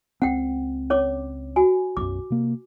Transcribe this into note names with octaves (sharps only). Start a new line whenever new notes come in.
C#2 C4 F#5 G5
C#4 C#5 D6
F#4 G#5
B1 F#2 D6
C3 A#3